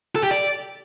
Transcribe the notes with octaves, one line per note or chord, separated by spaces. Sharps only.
A4
G4
D5